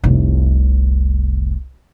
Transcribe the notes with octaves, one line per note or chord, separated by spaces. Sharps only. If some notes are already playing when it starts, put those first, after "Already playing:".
F1 C2